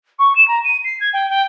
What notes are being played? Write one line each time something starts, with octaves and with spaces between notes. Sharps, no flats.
C#6
E7
A#5
D#7
C7
G#6
G5
G5